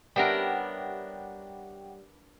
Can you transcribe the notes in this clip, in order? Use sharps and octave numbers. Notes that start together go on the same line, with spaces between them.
G3 B3 D4 A#4 C#5 E5 F#5 G5